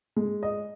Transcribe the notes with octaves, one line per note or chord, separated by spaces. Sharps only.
G#3
D#5